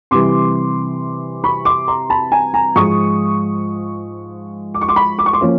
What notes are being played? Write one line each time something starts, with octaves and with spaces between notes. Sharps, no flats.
C3 E3 G3 C6 D6
B5 C#6
C6 D6
A#5 C6
A5 B5
G#5 A#5
G#5 A#5
G#2 F3 G#3 C#6 D#6
D6
C#6
C6 D6
B5 C#6
D6
C#6
C6 D6
F3 A#3 C#4